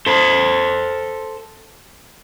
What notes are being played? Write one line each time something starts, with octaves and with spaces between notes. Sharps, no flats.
A4 C5